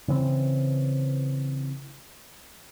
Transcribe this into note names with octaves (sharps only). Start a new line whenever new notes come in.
C#3 E3 C4